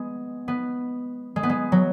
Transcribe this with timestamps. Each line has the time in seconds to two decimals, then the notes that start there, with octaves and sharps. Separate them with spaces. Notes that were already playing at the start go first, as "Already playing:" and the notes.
Already playing: G#3 B3
0.48 B3
1.36 G#3
1.43 B3
1.49 G#3
1.72 F#3